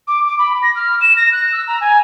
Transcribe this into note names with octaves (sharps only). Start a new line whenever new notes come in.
D6
D6
B5
A#6
F6
E7
A#6
F#6
E6
A#5
G#5